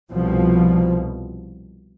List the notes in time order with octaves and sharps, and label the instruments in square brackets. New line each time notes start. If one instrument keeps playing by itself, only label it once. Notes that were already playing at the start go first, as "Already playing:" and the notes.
[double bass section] C2 B2 F3